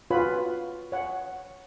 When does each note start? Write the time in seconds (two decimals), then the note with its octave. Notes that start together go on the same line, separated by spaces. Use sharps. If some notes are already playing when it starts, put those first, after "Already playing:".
0.11 F4 F#4 B4 C#5 B5
0.92 C#5 F#5